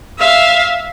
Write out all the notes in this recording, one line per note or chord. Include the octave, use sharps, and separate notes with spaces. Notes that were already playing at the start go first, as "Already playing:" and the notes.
E5 F5